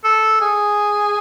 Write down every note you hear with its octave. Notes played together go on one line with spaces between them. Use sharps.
A4
G#4